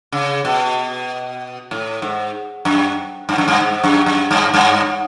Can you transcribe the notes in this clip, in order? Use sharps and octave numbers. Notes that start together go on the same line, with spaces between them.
C#3
B2
A2
G#2
F#2
G2
F#2
G2
G#2
F#2
F#2
G2
G2